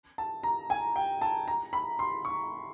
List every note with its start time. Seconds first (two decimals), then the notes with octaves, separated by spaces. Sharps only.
0.18 A5
0.43 A#5
0.70 G#5
0.96 G5
1.22 A5
1.48 A#5
1.73 B5
1.99 C6
2.25 C#6